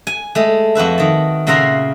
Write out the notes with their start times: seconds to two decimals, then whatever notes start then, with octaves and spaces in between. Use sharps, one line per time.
0.07 G#5
0.35 G#3 A3
0.75 F2 F#4 B4 E5
0.98 D#3 A5
1.47 A#2 C#3 E5 F#5 A#5 C6